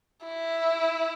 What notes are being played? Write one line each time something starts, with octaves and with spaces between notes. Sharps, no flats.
E4